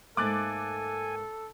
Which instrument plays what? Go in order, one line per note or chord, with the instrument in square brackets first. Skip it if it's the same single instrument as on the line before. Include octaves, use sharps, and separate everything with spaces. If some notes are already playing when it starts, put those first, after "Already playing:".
[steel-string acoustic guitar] G#2 A3 A#3 [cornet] A4 [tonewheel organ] G#5 [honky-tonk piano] D6 F#6 A6